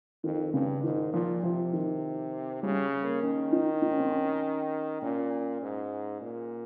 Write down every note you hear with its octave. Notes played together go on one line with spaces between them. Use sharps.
F2 D#3
G2 C#3
G#2 D#3
A#2 F3
C3 F3
D#3
C#3 G3
A#3
D#3 C#4
D#4
D#4
C#4
C4
C#4
A#2 C#4
G#2
A#2